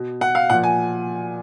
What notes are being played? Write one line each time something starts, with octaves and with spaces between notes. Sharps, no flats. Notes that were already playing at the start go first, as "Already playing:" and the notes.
Already playing: B2
F#5
F5
A#2 F3 F#5
G#5